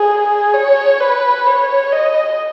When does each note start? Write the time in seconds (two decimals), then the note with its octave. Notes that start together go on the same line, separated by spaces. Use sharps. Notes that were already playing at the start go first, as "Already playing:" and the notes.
Already playing: G#4
0.54 C#5
1.00 B4
1.46 C#5
1.92 D#5